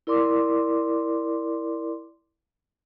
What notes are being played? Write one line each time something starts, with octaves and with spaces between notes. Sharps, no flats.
E4 A#4 D5 C6 D6